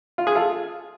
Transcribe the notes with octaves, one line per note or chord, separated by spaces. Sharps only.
F4
G#4
F4 A4